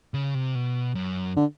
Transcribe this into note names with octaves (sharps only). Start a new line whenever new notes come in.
C#3
C3
B2
F#2
D3